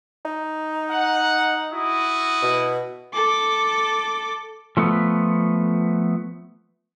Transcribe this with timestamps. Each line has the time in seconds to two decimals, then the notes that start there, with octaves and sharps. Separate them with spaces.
0.25 D#4
0.90 F#5
1.73 E4 F#4 D#6
2.42 B2
3.14 A4 D6
4.77 F3 A3 B3